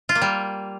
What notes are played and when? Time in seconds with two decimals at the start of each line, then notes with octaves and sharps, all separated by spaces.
0.09 F4
0.15 A#3
0.22 G3